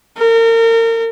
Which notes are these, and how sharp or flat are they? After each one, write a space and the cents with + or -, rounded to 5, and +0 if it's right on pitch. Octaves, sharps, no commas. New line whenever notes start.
A#4 -35